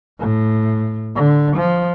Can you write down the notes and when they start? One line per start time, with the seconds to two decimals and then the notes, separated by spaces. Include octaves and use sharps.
0.19 A2
1.16 D3
1.57 F3